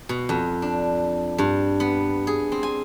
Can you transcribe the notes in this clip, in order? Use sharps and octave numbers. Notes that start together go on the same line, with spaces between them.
B2
F2
D4
G2
B3
G#4
C4
G#5